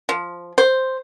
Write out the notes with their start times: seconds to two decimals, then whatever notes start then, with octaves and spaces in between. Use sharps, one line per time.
0.09 F3
0.58 C5